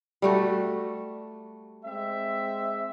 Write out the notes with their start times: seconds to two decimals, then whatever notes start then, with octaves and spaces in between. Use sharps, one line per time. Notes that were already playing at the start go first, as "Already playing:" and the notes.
0.22 G3 A3 F#4
1.85 G#3 C4 E5